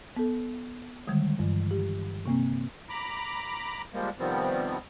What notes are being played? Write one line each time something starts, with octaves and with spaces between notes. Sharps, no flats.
B3 A4
D3 D#3 G3 G#3
G2 E3
G4
C3 A#3 C4
A#5 B5 D6
F3 G3 G#3 A#3
C3 D#3 F3 G3 B3 C4